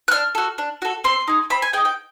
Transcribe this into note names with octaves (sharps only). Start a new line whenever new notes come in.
F#6
D4 F6
F#4 A4
D4
F#4 A4
C4 C6
D#4 G#4
C4 B5
G#5
D#4 G#4 G5
G5